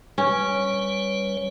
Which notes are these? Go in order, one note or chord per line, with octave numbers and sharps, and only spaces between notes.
G3 C#4 B4 C#5